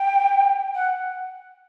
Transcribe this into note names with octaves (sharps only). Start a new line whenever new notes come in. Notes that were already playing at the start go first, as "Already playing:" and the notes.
Already playing: G5
F#5